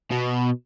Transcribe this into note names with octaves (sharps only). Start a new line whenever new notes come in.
B2